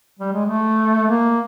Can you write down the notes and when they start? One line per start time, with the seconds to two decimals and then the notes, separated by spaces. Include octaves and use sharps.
0.19 G3
0.32 G#3
0.46 A3
1.07 A#3